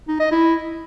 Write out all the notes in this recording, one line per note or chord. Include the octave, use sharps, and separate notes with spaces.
D#4
D#5
E4